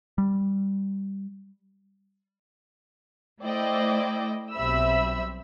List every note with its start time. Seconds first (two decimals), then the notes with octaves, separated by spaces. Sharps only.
0.18 G3
3.43 A3 E4 C5 D5 D#5 G5
4.54 B1 G3 C4 E5 B5 E6